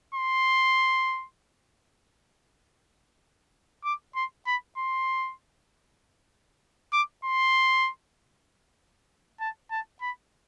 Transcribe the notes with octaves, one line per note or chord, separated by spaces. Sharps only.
C6
D6
C6
B5
C6
D6
C6
A5
A5
B5